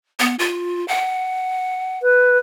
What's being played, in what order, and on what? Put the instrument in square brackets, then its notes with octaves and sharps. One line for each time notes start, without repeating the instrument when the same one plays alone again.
[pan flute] B3
F4
F#5
[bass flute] B4